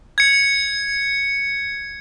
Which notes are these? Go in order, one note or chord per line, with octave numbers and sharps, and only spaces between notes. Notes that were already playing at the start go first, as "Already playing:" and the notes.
G#6 C#7